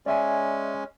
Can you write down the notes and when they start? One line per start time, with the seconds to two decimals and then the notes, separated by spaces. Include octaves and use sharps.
0.06 G#3 C#4 D5 E5 G#5